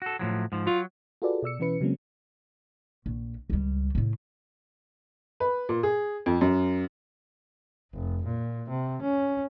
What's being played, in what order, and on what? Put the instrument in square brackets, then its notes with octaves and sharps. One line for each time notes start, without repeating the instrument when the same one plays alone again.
[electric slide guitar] F#4 A4
A2 F3 F#3
G#2 F3
[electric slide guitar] F#3 [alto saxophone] F4
[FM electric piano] F4 F#4 G#4 A4 B4 D5
B2 D5 E6 C#7
B2 E3 C#4 E4 B4 C#7
C#3 F#3 G#3 A#3 C4 C#4
[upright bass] A#1
C#2 G3
A2 C#3
[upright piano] B4
A#2
G#4
F2
F#2
[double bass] F1
A#2
C3
C#4